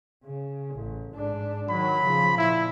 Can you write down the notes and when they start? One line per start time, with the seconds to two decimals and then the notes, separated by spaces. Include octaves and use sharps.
0.24 C#3
0.75 A1
1.15 G#2 D4
1.69 D#3 F#3 B5
2.05 C#3 F3
2.38 A#2 E4